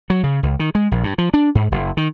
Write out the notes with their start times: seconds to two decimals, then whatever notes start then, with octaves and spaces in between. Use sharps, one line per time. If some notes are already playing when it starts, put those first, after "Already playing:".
0.10 F#3
0.24 C#3
0.43 C#2
0.59 D#3
0.75 G#3
0.91 A#1
1.04 G2
1.18 F3
1.34 D4
1.55 G#2
1.72 F#1
1.97 D#3